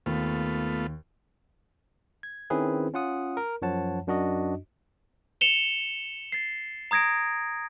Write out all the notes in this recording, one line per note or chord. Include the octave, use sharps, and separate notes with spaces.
D#2 A3 B3 F4
G#6
D#3 C4 C#4 E4 G#4 B4
C#4 F4 F#5 D#6
A#4
F#2 F3 C#5 F#5 A5
F#2 D4 F#4 D#5
C#7 E7 F7 G7
A6 C7
A#5 D#6 G#6 A#6 D7